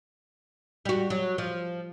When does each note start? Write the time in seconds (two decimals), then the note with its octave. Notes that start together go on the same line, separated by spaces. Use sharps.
0.85 G3 F#4
1.10 F#3
1.38 F3